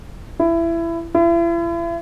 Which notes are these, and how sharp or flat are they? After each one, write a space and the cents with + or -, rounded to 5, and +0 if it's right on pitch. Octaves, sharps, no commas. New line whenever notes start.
E4 +20
E4 +40